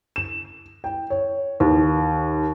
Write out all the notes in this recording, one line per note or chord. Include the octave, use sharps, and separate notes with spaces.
E7
G5
C#5
D#2